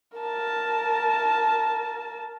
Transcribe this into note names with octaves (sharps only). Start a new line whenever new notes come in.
A#4 A5